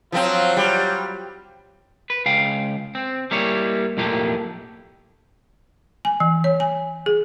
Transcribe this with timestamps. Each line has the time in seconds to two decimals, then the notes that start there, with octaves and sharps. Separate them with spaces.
0.12 F3 F#3 C4 F4
0.57 G3
2.10 B4
2.26 C#2 F5 G5
2.95 C4
3.31 G3 A#3 E4 C#5
3.97 B1 F2 A2 A#3 G4
6.05 G#5
6.20 E3
6.44 C#5
6.60 G#5
7.06 G#4